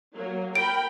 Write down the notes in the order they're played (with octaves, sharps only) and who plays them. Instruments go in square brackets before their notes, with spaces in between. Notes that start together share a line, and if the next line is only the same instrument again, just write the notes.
[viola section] F#3 A#3
[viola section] A#4 G5 B5 [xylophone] D7